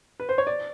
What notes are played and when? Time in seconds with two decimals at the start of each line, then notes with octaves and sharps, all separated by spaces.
0.20 B4
0.29 C5
0.38 C#5
0.47 D5